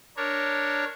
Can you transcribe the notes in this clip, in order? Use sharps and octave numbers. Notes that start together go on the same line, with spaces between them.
D4 A#4 C#5